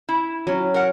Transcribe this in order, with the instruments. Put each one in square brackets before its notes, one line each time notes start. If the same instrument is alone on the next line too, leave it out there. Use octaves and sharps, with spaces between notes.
[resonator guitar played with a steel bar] E4
[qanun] F#3 C#4
[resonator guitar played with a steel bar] A#4 F#5